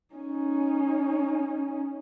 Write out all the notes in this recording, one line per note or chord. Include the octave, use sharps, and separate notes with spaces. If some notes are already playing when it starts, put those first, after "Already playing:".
C#4 D#4